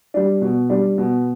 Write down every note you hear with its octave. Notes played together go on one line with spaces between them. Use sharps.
G3 D4
B2
G3 D4
B2